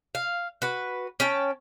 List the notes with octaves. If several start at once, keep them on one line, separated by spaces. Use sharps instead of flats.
F5
F#4 B4
C#4 G5 A5